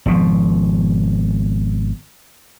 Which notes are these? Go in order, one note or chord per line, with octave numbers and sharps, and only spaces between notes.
G#1 B2 F3